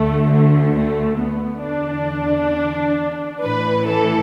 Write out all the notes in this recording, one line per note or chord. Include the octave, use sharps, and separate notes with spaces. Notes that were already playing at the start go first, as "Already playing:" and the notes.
Already playing: D2 D3 A3
A3
A3
B3
E2 D3 D4
A1 A2 E3 B4
A4